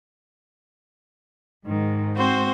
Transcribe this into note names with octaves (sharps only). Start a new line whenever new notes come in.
G#2 D#3
C4 F#4 C5